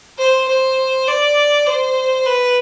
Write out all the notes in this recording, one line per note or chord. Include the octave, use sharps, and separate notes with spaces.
C5
C5
D5
C5
B4